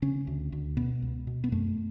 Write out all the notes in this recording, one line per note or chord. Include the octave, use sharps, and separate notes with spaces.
C#3 C#4
D2
D2
B2 B3
C#2
B2
B3
F#2 A3